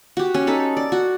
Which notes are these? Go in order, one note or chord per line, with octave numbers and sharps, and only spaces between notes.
F#4 G4
C#4
D#4 A4 B5
D5
F#4